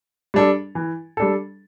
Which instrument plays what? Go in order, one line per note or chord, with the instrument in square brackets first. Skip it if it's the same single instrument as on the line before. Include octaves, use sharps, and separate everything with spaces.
[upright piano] G3 D4 A4
E3
G3 D4 A4